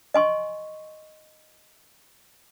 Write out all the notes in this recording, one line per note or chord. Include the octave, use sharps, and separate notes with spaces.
D#5 G#5 C6 C#6